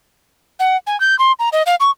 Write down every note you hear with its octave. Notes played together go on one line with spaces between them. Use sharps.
F#5
G#5
G6
C6
A#5
D#5
F5
C#6